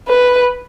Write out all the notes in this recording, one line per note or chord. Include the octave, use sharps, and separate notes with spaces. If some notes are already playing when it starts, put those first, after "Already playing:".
B4